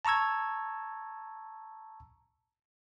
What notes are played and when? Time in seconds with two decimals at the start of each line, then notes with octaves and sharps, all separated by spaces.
0.05 A5 A#5 C#6 E6 G#6